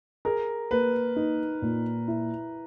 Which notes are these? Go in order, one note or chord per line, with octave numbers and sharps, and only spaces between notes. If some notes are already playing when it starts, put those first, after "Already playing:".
G#4 A#4
A#3 B4
D#4
A#2
E4